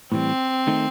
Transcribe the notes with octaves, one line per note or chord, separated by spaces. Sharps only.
A2 E3 G3 C4
D#3 A3 D#4